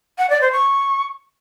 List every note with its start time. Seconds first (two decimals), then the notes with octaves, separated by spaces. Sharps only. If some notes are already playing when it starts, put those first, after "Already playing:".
0.18 F#5
0.29 D5
0.41 C5
0.52 C#6